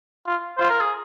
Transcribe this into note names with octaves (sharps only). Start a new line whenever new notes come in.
F4
F4 C5
A#4
G#4